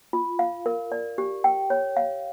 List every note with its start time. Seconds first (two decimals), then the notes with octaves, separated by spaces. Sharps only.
0.13 F4
0.39 F5
0.66 A#4
0.92 D5
1.18 G4
1.44 G5
1.70 C#5
1.97 F5